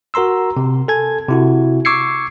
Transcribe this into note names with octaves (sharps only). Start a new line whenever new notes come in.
F#4 A#4 A#5 C6 E6
C3
A4 G#5 G#6
C3 E4 F#4
C#6 D6 E6 G#6 C7 C#7